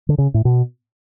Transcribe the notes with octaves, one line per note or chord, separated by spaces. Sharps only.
D3
C#3
A2
B2